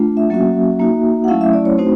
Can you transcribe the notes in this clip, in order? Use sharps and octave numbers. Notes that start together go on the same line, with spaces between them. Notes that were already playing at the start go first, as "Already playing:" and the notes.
Already playing: A3 D4 F4
E5
F#3 A#3 C#4 F#4
A#3 D#4 F#4
F#5
F#3 A3 C#4 E4 F5
E5
D5
C#5
A3 C4 D#4 F#4 C5